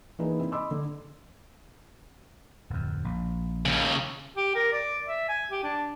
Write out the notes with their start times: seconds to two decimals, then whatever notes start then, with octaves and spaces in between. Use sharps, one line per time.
0.19 E3 A#3 D4 D#4 G#4 B4
0.39 C4 E4
0.52 D#5 B5 C6 D6 E6
0.71 D3
2.70 D1 F2
3.05 A#1
3.66 D#2 C#3
4.36 G4
4.55 A#4
4.72 D5
5.07 E5
5.29 G#5
5.50 G4
5.64 D4